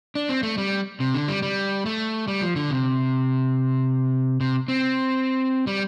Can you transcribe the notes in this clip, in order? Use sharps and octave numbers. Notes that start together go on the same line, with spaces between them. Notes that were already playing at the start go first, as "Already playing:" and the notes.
D4
C4
A3
G3
C3
D3
G3
G3
A3
G3
F3
D3
C3
C3
C4
G3